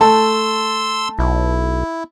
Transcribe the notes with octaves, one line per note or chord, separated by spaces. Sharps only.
A3 A4 A5 C6 E6
B1 E4